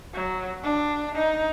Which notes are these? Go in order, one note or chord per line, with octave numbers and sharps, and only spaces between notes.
F#3
D4
D#4